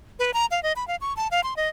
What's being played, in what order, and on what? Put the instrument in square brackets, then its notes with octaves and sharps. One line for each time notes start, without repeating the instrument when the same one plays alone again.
[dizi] B4
A#5
F5
D#5
B5
F5
C#6
A5
F5
C6
D#5